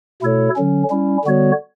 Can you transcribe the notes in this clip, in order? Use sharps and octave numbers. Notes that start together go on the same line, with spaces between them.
B2 A3 E4 A4 C#5
D3 F#3 C#4
G3 C#4 E4
D3 G3 B3 F#4 C#5